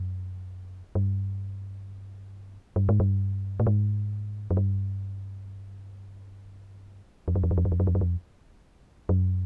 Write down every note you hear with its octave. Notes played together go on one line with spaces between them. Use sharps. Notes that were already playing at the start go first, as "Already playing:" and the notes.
Already playing: F#2
G2
G2
G#2
G2
A2
G#2
F#2
G2
F2
F#2
F2
F#2
F2
F#2
F2
F#2
F2
F#2
F2
F#2